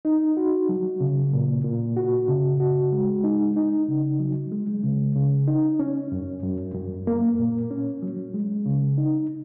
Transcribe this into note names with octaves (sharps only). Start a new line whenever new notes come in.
D#4
F#4
F#3
C#3
A#2
A#2
F#4
C#3
F#4
G#3
D#4
D#4
C#3
F#3
G#3
C#3
C#3
D#4
C#4
F#2
F#2
F#2
A#3
A#2
C#4
F#3
G#3
C#3
D#4